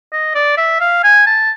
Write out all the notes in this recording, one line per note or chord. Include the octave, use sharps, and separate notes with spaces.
D#5
D5
E5
F5
G#5
A5